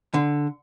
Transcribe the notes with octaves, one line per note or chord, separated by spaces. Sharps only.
D3